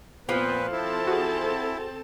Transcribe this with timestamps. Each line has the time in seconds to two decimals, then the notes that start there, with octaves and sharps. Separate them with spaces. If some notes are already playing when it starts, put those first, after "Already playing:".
0.29 A#2 F3 B3 C4 B4
0.72 C4 E4 A4 A5
1.07 F#4 G#4